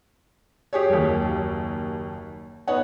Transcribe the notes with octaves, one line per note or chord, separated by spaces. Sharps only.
G4 G#4 C#5
F#1 D#2
B3 D#4 C#5 F#5